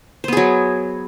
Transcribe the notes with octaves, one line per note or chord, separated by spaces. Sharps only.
F#3 B3 G#4 C5